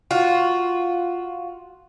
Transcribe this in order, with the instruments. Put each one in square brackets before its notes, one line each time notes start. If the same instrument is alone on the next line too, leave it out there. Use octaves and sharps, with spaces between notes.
[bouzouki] F4 F#4